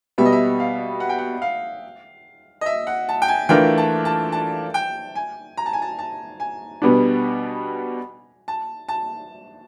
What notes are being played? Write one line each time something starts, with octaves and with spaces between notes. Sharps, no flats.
B2 G3 B3 E5
D#5
E5
F5
F#5
G5
F#5
F5
D#5
E5
F#5
A5
G5
G#5
E3 A3 D4 F4 A#4 G5
A5
A5
A5
G5
G#5
A#5
A5
G#5
A5
A5
G#5
B2 G3 B3 D4
A5
A5